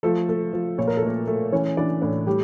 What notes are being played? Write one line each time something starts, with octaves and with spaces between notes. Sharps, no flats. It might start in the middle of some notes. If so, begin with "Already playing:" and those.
F3 A3 A4
A3
F3
A#2 C#5
A#4
A4
A3 A#3 A#4
A3
E3 C#4 C#5
E3 D4 D5
A2 D4 D5
G3 A3 G4